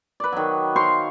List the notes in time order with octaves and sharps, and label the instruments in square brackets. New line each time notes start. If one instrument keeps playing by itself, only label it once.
[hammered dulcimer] B4 D5
D#3 F#3
C5 F5 C6 C#6